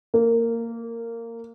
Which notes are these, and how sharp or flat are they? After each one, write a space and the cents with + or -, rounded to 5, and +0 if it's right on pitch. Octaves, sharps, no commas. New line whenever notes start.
A#3 -15